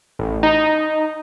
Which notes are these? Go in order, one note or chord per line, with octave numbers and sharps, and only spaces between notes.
A1
D#4